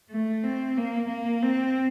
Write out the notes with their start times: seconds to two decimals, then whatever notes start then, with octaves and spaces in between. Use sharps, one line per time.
0.11 A3
0.44 C4
0.77 A#3
1.09 A#3
1.43 C4